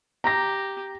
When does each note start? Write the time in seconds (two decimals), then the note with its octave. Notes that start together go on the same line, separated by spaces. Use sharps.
0.24 G4 A#5 A#6